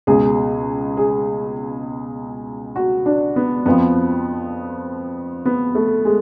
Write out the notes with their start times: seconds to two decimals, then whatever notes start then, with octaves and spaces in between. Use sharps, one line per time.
0.07 C#2 B2 G#4
0.97 G#4
2.76 F#4
3.06 D4
3.36 B3
3.66 F2 F3 B3
5.45 B3
5.75 A3
6.05 G#3